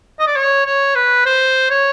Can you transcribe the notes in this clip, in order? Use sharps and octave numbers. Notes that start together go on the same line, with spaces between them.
D#5
D5
C#5
C#5
B4
C5
C#5